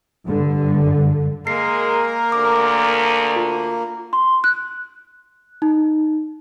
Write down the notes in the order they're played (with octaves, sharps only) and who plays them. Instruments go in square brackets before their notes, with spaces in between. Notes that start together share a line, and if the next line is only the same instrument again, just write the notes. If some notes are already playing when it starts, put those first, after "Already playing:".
[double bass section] G2 D3
[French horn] G#3 [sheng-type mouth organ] A#3 [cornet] A#4 [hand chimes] C7
[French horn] D2 [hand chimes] D6
[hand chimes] F4
[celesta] C6
F#6
D#4